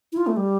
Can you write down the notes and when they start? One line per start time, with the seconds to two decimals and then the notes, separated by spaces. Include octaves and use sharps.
0.12 E4
0.17 F4
0.27 A3
0.37 G3